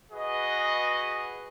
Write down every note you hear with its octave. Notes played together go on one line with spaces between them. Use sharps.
F#4 G#4 B4 D#5